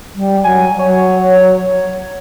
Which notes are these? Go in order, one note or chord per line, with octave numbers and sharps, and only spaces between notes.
G3
F#3 G#5
F#3 C#5